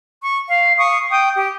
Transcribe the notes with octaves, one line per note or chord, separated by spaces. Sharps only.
C#6
F5
F5 C#6 D#6
G5 D#6
G4